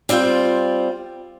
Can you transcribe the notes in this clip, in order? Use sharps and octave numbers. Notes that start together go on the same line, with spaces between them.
G3 C4 F4 C5 G5